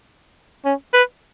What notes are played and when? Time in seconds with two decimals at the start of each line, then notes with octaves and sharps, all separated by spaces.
0.65 C#4
0.93 B4